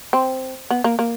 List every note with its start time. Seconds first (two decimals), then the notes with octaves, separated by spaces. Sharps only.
0.13 C4
0.70 B3
0.84 A#3
0.99 A#3